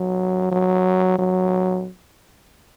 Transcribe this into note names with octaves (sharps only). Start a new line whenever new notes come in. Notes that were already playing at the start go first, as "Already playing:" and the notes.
Already playing: F#3
F#3
F#3